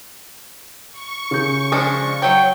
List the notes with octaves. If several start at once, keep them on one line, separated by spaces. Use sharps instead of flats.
C#6
C#3 G6
F3 G#3 D4
F#3 C#5 G5